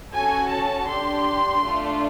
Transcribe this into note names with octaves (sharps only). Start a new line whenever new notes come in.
C#4 F#4 A4 G#5
A5
D4 G4 C6
A3 D4 F4